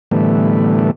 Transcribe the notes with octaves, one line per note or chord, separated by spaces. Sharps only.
A2 D3 E3 G3 A3 B3